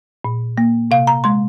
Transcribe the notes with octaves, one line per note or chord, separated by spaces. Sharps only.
A#2
A#3
C3 F5
A#5
G#3 C6